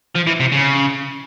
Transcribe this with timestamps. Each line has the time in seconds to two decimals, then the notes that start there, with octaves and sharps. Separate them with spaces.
0.16 F3
0.27 E3
0.40 C3
0.52 C#3